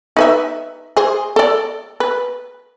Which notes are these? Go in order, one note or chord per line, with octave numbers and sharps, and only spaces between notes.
D#4 B4 E5
G#4 C5
A4 D5
B4